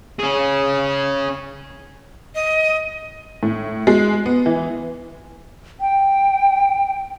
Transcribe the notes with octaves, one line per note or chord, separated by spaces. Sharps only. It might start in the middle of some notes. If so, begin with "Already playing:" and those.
C#4 G#4
D#5
A2
G#3
B3
E3
G5